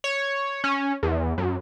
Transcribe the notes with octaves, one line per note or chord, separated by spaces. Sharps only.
C#5
C#4
E2
F#2